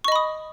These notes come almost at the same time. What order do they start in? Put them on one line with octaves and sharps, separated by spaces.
C#6 D#5 B5 D#6